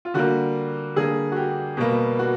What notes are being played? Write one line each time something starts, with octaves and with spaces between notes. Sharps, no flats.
F4
D3 G3 A#3 F#4
D3 G3 A#3 G#4
F#4
G4
B2 G3 A#3
F#4